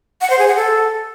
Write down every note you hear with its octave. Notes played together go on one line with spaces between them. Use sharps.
F#5
C5
G#4
F#5
A4